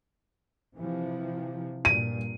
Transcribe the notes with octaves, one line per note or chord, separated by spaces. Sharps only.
C3 E3 F3
G2 A#2 D#7